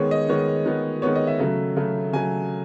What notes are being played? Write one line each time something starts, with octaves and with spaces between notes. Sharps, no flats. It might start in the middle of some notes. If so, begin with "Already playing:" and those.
Already playing: D#3 G#3 B3 C#5
D#5
D#3 G#3 B3 C#5
D#3 G#3 B3
D#3 G#3 B3 C#5
D#5
E5
C#3 F#3 A3
C#3 F#3 A3
C#3 F#3 A3 G#5